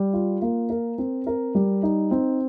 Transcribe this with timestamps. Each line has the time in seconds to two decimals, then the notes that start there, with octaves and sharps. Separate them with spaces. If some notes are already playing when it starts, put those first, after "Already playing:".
Already playing: G3
0.13 F4
0.42 A#3
0.70 A#4
0.98 C4
1.27 A#4
1.55 G3
1.83 D#4
2.11 C4